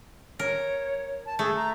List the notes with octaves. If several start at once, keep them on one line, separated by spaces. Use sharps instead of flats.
A#4 C#5
A5
A3 G#4
A#5